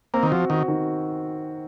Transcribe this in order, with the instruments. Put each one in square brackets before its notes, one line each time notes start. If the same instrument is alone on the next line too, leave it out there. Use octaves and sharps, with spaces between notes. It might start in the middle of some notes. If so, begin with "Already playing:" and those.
[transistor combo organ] A#3 [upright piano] C4
[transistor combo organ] D#3
[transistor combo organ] F3 [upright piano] F#4
[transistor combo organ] D#3 [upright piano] F#4
[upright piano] D#3